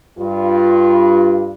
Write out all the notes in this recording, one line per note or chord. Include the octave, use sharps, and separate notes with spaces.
G2 F4